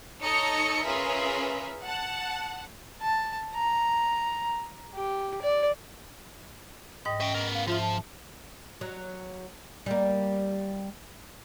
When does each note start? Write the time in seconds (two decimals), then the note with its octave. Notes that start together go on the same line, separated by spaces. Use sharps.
0.23 D#4 A4 C#5 D#5 A#5 C#7
0.83 C#4 F4 G#4 A#4 B4 E5
1.85 F#5 A5
3.01 A5
3.55 A#5
4.94 G4
5.42 D5
7.05 G#2 D#5 G5 D#6
7.21 C#4 E5 G5
7.34 B3 A#4
7.54 F5
7.67 G#2 F3 F4 E5 F6
7.81 A5
8.81 F#3
9.86 G3 A#3